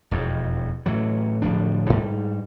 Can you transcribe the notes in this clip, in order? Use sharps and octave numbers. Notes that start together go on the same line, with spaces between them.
E1 F2
A2 E3 F#3
D1 A2 F3 D4
G#2 G3